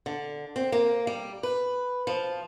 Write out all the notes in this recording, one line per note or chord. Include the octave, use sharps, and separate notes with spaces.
D3
C4
A#3
G3
B4
F3